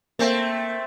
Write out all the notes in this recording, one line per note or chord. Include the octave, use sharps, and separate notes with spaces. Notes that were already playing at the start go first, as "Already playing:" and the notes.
A3 A#3 C4